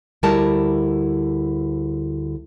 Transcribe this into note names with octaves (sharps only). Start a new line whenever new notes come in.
D2 G3 E4 A#4 A5